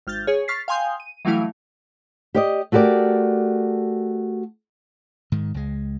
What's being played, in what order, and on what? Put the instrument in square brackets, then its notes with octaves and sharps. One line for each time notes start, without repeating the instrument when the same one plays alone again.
[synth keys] G#1 F6 G6 A6
G#4 C#5
C#6 F6 A6 B6 C7
F5 G5 G#5 C6 D#6 G6
D#7
E3 F#3 G3 A3 E4 F5
[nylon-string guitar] G4 D5 D#5
A3 F#4 G4 A#4 D5
[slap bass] G#2 D#3
C#2 G#3